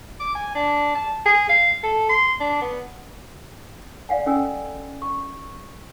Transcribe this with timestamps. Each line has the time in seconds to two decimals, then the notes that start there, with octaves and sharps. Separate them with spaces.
0.20 D6
0.35 G#5
0.55 D4
0.95 A5
1.26 G#4
1.49 F5
1.84 A4
2.09 C6
2.40 D4
2.61 B3
4.09 D5 F5 F#5 G#5
4.26 C#4 A4 D#5 G#5 E6
5.02 C#6